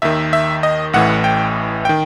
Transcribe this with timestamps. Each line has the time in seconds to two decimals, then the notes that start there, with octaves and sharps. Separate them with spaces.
0.02 D#2 D#3 E5
0.33 E5
0.63 D#5
0.93 A1 A2 E3 F#5
1.24 G5
1.85 D#3 G5